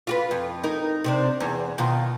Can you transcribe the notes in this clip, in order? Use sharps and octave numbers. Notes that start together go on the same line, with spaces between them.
F4 F#4 B4
F2
D#4 A#4
C3 C4 D4
E2
B2 D#3 F4